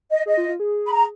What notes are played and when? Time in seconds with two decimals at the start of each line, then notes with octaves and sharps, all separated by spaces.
0.10 D#5
0.26 G#4 D#5
0.37 F4
0.48 F4
0.60 G#4
0.86 B5
0.92 A#5